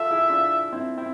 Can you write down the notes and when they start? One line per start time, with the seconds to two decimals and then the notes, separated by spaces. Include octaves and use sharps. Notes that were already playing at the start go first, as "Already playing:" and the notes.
Already playing: F4 A4 E5
0.11 E4 G#4
0.29 D4 F4
0.72 C4 E4
0.97 C4 E4